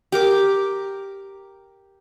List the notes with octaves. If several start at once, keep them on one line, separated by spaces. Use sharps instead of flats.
G4 A#4 D6